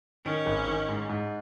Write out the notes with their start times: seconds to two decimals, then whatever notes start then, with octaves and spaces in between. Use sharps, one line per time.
0.25 D#3 C#4
0.46 G#1
0.68 D#3
0.89 G#2
1.09 G#2